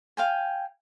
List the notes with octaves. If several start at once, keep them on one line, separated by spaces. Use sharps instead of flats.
F5 G5 G#5